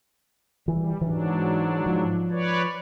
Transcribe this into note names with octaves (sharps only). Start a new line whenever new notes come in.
E3 G3
G#2 E3 F#3 D4
F3
B4 C#5 D5